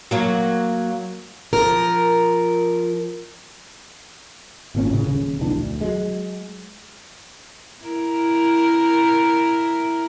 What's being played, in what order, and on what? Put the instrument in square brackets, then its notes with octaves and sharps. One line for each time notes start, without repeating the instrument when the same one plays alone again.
[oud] F#3 A#3
[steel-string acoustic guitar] F3 A#4
[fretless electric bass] G#1 A#2 C#4
A2 C#3
D#1 C#3
F1 B1 E3 D4
D2
F#3 G#3
[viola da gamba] E4 A#4